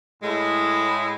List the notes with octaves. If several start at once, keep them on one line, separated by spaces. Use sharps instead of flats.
A2 G#3 E4